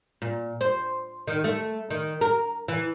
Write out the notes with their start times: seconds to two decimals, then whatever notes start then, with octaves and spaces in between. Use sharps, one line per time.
0.22 A#2
0.61 C5
1.27 D#3
1.44 A3
1.90 D#3
2.21 A#4
2.68 E3